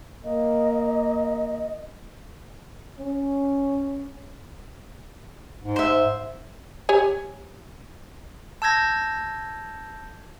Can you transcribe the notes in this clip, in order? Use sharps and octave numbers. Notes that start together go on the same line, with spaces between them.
A#3 D#5
C#4
G#2
C5 E5
G4 C#5 G#5
A5 E6 G6 G#6 A#6